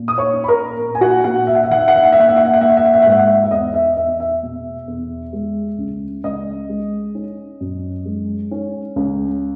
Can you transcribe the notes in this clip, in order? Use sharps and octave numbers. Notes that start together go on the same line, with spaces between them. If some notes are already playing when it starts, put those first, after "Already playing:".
Already playing: A#2
D#6
C#5 C#6
C#4
B5
A#4 A#5
A#2
G#5
F#4 F#5
A#2 F#4 F#5
E5
F#5
E5
D#3 F#5
E5
F#5
E5
F#5
A#3 E5
F#5
E5
F#5
E5
F#5
A#3 E5
F#5
E5
F#5
E5
F#5
G#2 E5
F#5
E5
E5
E2 D#5
E5
E2 E5
E5
B2
E2
G#3
C#2
C#2 D#5
G#3
C#4
F#2
G#3
C#4
C#2